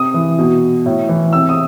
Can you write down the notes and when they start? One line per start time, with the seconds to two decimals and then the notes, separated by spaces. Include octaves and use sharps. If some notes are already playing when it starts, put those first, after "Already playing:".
Already playing: C3 D#6
0.14 E3
0.39 B2
0.86 A2
1.09 E3
1.33 C3 E6
1.49 D#6